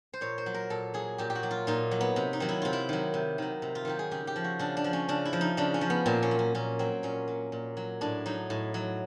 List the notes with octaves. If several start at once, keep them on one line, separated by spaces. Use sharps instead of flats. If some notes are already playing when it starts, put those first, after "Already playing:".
C5
A#2 C#5
C5
F#3
A#4
A#2 A4
F#3 G#4
A#2 G4
G4
F#4
F#3
F4
A#2 D#4
F#3
B3
C3
D#4
D#3 F#3
E4
C3 F4
E4
D#3 F#3
C3
D#3 F#3
C3
F4
D#3 F#3 G4
G#4
C#3 G4
G4
F3
F#4
C#3 D4
D4
F3
C#4
C#3 D4
E4
F3
D#4
C#3 D4
C#4
F3
B3
A#2 C4
C#4
F#3
C#4
A#2 C#4
F#3 C4
A#2 C#4
F#3
A#2
F#3
A2 D4
F#3 D#4
A2
F#3